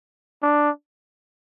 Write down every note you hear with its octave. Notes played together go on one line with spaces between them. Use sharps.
D4